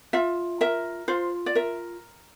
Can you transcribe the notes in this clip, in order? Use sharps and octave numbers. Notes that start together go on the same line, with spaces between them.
F4 E5
A#4 E5
F4 C5
D5
A#4 E5